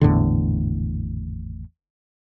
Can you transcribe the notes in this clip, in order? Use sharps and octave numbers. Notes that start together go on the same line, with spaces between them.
G#1 E2 A2 D3